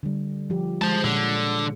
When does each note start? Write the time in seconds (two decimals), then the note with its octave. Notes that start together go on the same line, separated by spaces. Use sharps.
0.03 D3 G3
0.50 F3 G4
0.82 G#3 C5 A5
1.04 A#2 D3 C#5